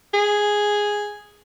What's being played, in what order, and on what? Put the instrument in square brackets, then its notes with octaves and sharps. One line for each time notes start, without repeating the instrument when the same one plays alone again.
[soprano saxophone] G#4